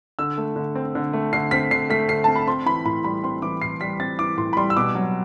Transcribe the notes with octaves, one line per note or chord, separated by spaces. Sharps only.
D3 E6
A3
D3
C4
D3
A3
D3 C7
C4 B6
D3 C7
A3 B6
D3 C7
C4 A5
B5
C4 C6
E3 B5
A2 B5
G3 B5
C4 C6
E3 D6
A2 C7
G3 B6
C4 A6
E3 D6
A2 C6
B5
G3 C6
E6
B2 D6
F#3